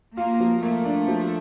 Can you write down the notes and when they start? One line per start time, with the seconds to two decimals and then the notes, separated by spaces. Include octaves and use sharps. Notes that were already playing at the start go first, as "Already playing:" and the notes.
0.17 A#3 F4
0.40 F3
0.63 A3 A#3
0.85 D4
1.08 F3